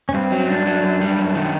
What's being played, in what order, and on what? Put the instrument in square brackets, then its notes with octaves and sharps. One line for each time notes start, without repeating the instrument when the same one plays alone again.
[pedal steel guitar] C#4
[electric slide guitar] G2 [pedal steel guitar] C4
[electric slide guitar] F#3
[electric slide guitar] G2 [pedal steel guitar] D4
[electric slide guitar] F#3
F#2
G3
F#2
D#3